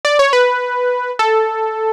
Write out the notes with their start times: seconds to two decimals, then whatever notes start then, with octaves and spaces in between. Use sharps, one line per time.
0.05 D5
0.19 C#5
0.33 B4
1.19 A4